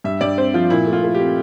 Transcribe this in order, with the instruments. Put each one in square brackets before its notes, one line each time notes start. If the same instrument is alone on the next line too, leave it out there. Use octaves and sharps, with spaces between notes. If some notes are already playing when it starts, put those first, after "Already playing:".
[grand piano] G2 E5
G2 D5
C4 C5
F3 F4
A#2 E4
A3
F4
A3
G4
C4